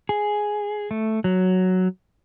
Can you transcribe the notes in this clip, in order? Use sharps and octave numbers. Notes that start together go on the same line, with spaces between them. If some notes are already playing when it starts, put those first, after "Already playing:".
G#4
A3
F#3